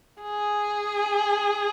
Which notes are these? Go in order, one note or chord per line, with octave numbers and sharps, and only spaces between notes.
G#4